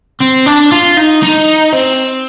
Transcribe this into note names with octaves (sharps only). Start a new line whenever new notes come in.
C4
D4
F4
D#4
D#4
C4